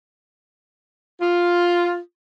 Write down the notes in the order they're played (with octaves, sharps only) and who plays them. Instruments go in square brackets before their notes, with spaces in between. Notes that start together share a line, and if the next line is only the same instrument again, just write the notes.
[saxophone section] F4